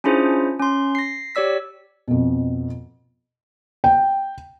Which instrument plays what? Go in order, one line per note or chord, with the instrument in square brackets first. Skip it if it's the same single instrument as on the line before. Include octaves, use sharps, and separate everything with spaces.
[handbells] C#4 D4 E4 F4 G#4 C5
C#4 C6
A#6 C7
G4 C#5 D5 E6 B6
[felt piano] F2 B2
G5